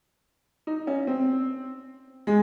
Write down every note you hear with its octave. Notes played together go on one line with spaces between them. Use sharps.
D#4
C#4
C4
G#3